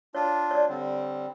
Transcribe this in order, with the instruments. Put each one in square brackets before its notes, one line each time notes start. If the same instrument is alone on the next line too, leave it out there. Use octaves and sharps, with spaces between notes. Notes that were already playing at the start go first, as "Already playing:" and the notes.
[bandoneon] D4 F4 [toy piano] C#5
[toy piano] C#5 D5
[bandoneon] D3 G3 C4